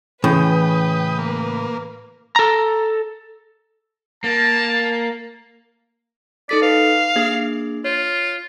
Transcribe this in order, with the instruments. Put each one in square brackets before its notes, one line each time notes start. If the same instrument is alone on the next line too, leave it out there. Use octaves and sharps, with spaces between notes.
[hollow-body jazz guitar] A2 C#3 [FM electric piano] E3 [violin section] B4 [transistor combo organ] G5 D#6
[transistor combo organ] A#3
[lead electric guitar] A4 A#5
[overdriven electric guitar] A#3 [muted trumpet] A5
[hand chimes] D#4 A4 B6 [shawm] D5
[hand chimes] B4 [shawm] F5
[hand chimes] A#3 D4 G#4
[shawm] F4 [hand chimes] C#5